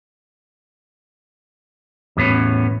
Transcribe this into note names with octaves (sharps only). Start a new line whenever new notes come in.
E2 A2 B3 C#4